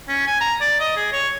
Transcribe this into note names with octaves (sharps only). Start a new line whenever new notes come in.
C#4
G#5
A#5
D5
D#5
G#4
C#5